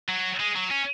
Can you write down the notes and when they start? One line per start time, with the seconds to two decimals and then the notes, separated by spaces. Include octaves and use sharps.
0.08 F#3
0.40 G#3
0.55 F#3
0.70 C#4